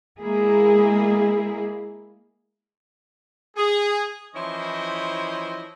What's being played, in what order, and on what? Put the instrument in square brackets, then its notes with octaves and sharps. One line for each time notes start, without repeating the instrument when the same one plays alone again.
[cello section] G#3 A#3 E4 G#4
[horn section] G#4
E3 F3 C#4 E4 C5 D#5